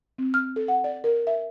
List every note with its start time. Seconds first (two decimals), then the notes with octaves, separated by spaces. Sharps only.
0.18 C4
0.34 F6
0.56 A4
0.68 F#5
0.84 D5
1.04 A#4
1.27 E5